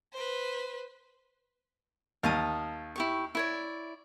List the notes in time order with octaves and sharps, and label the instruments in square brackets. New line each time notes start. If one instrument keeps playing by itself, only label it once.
[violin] B4 C5
[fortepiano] D#2 [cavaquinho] F5 A5 D#6
[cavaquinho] E4 G4 C#6
E4 C#5 D5